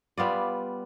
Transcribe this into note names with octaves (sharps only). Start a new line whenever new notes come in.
G3 B3 F4 D5